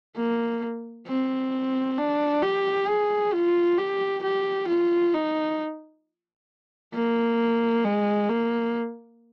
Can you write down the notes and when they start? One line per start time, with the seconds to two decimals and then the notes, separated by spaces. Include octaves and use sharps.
0.16 A#3
1.07 C4
1.98 D4
2.42 G4
2.87 G#4
3.33 F4
3.78 G4
4.23 G4
4.68 F4
5.14 D#4
6.94 A#3
7.85 G#3
8.30 A#3